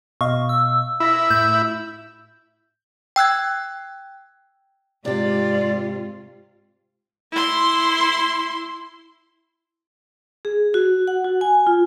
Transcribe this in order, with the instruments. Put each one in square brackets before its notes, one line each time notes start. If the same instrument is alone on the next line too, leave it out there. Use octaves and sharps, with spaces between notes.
[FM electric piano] B2 D#5 F5 [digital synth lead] C#6
[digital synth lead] E6
[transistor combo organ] E4 [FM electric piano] B5 A#6 B6
[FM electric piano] A2 [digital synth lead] G6
[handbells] G5 E6 F#6 G#6
[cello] G#2 F4 [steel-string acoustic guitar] C3 G4 [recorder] D5
[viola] E4 C6
[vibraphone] G#4
F#4
F#5
F#4
G#5
F4